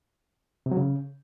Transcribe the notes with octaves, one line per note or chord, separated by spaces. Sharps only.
C3
F#3
C#3